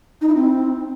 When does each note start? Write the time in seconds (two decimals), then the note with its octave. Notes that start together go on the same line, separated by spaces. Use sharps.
0.21 D#4
0.28 E4
0.35 C4